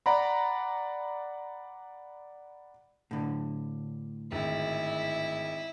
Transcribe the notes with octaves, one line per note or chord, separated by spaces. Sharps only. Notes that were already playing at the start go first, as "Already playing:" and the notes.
D5 F#5 A#5 B5
A2 D3
G#1 E4